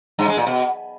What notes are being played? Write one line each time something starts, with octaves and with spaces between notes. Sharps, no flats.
G2
G#3
A#2
B2